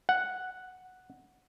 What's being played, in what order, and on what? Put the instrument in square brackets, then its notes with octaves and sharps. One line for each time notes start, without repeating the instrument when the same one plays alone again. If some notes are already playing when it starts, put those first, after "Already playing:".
[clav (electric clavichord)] F#5